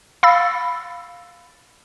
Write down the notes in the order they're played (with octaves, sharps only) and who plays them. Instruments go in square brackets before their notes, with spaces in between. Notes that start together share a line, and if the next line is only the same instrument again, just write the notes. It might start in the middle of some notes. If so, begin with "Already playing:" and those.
[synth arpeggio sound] F5 B5 E6 A6